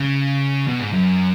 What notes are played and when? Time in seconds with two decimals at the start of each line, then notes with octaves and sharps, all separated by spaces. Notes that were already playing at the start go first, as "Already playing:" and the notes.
Already playing: C#3
0.67 B2
0.80 G#2
0.93 F#2